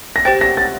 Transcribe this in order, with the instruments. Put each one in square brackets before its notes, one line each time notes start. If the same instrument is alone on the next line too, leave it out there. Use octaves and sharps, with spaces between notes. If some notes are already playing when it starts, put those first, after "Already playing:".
[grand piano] A#6
[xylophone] G4 C5 G5 [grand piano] A6
[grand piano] A#6
A6